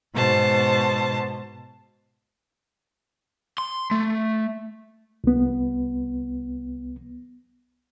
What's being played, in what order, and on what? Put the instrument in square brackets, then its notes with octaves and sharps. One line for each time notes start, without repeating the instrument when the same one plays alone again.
[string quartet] G#2 B2 C5 A5
[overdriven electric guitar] C6
A3
[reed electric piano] C2 B3